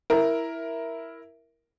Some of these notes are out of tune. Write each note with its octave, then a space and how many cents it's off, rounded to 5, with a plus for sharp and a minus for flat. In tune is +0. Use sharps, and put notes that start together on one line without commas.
E4 +0 A#4 +5